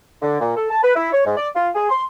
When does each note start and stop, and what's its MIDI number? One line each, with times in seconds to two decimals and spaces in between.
0.22 0.40 50
0.41 0.55 46
0.57 0.69 69
0.71 0.81 81
0.83 0.93 71
0.95 1.12 64
1.13 1.23 73
1.25 1.36 44
1.37 1.48 74
1.56 1.69 65
1.75 1.88 68
1.89 2.03 84